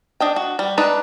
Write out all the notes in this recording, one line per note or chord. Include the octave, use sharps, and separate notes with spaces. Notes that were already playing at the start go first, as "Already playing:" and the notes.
D4 D#5 G5
F#4
G3
D4 D#4 B4